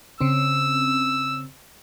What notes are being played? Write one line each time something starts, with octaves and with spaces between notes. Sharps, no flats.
C#3 C4 E6